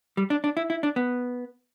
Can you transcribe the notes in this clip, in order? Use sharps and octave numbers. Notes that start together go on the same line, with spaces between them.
G3
D4
D4
E4
E4
D4
B3